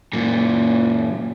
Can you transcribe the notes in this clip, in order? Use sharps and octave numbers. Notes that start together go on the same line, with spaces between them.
F#2 A#2